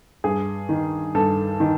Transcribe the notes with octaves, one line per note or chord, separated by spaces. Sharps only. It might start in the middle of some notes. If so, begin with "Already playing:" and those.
G2 G#4
D#3
G2 A4
D#3